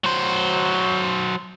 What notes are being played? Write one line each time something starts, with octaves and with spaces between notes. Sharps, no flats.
F#3 C5